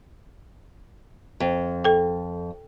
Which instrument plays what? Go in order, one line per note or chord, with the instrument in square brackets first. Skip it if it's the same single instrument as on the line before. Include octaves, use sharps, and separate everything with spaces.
[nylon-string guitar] F2
[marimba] A4 G5